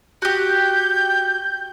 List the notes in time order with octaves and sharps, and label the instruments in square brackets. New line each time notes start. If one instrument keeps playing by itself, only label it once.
[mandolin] F#4 G4 [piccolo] G6